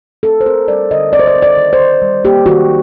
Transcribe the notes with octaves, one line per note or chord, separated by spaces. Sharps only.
C4 A4
C5
C4 A#4
G3 D5
D3 D#5
C4 D5
C5
D5
C4
D5
D#3
C5
D#3
G3
A#3 G4
D#3 F#4